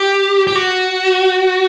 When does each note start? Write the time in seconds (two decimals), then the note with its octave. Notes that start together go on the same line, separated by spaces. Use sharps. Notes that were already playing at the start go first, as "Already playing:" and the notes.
Already playing: G4
0.47 G4
0.55 F#4